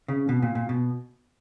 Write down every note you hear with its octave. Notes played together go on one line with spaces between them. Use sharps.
C#3
B2
A#2
A#2
B2